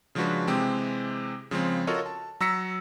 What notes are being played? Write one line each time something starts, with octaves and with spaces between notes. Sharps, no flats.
C#3 F3 G#3 D4 F#4 B4
C3 E3 G#3 C4 G4
C#3 F3 G#3 C4
F4 F#4 A4 A#4 C#5 D#5
A5
F#3 A#5 E6 A#6 B6 C#7